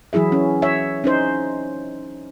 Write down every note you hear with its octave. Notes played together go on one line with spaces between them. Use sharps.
E3 F#3 E4 G#4 E5
C#4
C#5 E5
C#4 D#4 C5